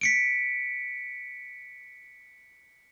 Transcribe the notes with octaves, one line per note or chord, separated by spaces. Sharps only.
B6 C#7 D7